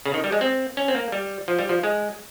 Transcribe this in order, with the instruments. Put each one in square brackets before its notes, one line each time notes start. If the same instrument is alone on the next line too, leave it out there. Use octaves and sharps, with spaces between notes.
[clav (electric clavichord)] C#3
D#3
G3
G#3
C4
C#4
C4
A#3
G3
F3
G3
F3
G#3